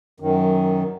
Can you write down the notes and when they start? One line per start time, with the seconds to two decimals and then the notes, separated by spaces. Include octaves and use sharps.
0.20 F#2 D#3